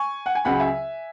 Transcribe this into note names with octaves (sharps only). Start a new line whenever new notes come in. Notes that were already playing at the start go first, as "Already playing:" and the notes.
Already playing: G#5 C#6
F#5
G#5
C#2 C#3 F#3 F#5 B5
E5 G#5